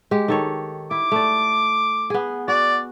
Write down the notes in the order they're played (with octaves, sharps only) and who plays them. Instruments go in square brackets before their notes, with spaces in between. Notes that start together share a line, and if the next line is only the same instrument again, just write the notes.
[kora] G#3 G4
D#3 A4 C#5
[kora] E4 [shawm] D6
[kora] A3 D5
B3 G#4
[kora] F#4 [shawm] D5